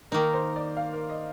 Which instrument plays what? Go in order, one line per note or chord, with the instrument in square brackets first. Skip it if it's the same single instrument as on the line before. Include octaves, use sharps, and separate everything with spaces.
[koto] D#3 A#3 D#4 [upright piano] A#4
[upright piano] C5
D5
F5
A#4
D#5